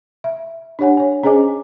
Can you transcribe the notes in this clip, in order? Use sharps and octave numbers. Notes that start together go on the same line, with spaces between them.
E5
D4 G4 C#5 F#5 G#5
C#5 G#5
C#4 G#4 C5 D#5 G#5 D6